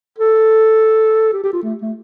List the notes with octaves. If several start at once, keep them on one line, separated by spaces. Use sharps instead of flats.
A4
G4
G4
F4
A3
A3